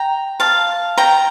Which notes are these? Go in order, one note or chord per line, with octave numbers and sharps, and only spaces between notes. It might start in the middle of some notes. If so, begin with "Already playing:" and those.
Already playing: G5 A#5
F5 A5
G5 A#5